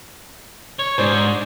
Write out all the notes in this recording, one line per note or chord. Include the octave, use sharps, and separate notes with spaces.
C#5
G#2 D4 C5